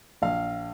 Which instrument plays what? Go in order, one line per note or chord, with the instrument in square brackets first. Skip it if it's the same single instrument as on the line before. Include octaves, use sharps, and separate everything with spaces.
[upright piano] A#1 F5